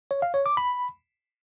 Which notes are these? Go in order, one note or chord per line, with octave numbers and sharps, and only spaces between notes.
C#5
F5
C#5
D6
B5